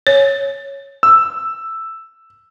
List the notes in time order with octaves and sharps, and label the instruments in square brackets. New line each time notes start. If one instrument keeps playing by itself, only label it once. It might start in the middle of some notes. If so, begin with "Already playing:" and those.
[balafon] C#5
[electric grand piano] E6